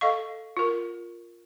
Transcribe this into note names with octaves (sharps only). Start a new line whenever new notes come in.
A4 D#5 F5 C#6
F4 A#4